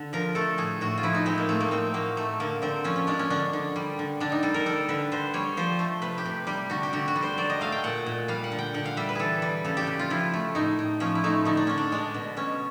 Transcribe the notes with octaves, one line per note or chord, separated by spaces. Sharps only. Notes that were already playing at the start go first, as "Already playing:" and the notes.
Already playing: D3
F3 A#4
A3 A4
A2 G#4
A2 F#4
F4
F3 E4
D#4
G#3 C4
A#3
A2 A3
A#3
A2 C4
F#3 A#3
A3
D3 A#3
D3 C4
F3 C#4
C#4
G#3 D4
C#4
D3 D4
D3
G3
D3
D3 D4
D#4
G3 A4
A#4
G3 A4
D3 B4
D3 C5
G3 C#5
F3 C5
A3
C3 B4
G4
C3
G3 G4
D3 F#4
G4
D3 F#4
F#4
G3
C5
F#3 D5
D#5
A3 F5
G5
A#2 F#5
A#2
G3 F5
F#5
D3
G5
D3 F#5
F5
G3 E5
B4
E3 G#4 A4
G3
C#3 A4
G4
C#3
F4
F3 E4
A3
A2 D#4
A2
F3 C#4
E4
A3 D#4
D3 D#4
D4
D3 C#4
D4
G#3 D4
B2
B2 C#4